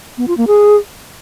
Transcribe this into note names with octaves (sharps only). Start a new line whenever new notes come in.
B3
F4
A#3
G#4